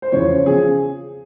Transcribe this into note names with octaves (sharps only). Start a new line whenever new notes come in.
C5
E2 C#3 F3 C#5
C#3 F3 G#4